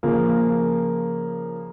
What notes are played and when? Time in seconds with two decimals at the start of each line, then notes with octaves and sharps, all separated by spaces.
0.03 C#3 F3 A#3